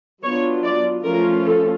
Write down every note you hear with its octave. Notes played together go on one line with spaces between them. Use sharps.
F#3 B3 D4 F4 C#5
D5
F3 A3 C#4 F4 A#4
A4